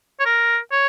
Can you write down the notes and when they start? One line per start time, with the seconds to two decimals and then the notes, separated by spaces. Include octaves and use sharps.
0.20 C#5
0.26 A#4
0.72 C#5